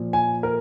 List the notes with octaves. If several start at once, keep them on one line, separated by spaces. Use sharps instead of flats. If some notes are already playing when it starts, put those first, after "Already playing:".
Already playing: A#2 F3
G#5
A#4